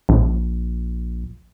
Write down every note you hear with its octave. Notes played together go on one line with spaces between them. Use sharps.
A#1